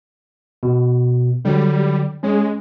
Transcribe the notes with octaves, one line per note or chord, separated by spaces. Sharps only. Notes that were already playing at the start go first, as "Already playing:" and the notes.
B2
D3 F#3 G3
G#3 C#4 C#5